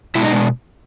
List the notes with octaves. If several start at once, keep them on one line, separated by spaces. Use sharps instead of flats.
B2 G#3 B3 D4 E4
D#4